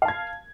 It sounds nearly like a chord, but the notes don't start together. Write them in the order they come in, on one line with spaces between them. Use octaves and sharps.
F5 A5 G#6